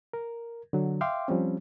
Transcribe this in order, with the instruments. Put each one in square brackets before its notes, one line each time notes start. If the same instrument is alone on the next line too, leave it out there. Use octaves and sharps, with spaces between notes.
[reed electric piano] A#4
D3 F#3
E5 F5 G5 C6 D6
F3 G3 C4 C#4